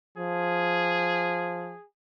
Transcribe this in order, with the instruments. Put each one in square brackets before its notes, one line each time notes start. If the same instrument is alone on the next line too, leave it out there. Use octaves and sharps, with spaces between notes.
[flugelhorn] F3 [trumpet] G#4